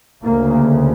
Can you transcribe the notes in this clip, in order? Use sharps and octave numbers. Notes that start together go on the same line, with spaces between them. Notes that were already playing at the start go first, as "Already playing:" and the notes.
D2 C#3 A#3